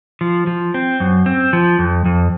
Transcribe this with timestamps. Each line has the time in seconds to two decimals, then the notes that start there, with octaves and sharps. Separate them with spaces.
0.21 F3
0.47 F3
0.74 C4
1.00 F#2
1.26 C4
1.53 F3
1.79 F2
2.05 F2